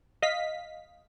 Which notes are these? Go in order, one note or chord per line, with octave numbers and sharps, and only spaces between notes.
D#5 F5 B6